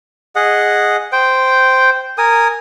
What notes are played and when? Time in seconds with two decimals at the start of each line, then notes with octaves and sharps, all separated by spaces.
0.36 G#4 D#5 F#5
1.12 C5 G5
2.18 A#4 G#5 D#6